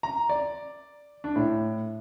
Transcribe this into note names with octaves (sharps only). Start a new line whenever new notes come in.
A#5
D5
D4
A2